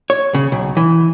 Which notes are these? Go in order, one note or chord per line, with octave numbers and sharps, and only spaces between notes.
C#5
C#3
B1
E3